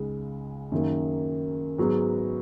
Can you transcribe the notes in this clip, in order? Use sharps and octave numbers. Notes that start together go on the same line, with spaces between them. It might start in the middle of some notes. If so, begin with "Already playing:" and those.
Already playing: C#2 C#3 G#3 D#4
F#2 D#3 A#3
G#2 F#3 B3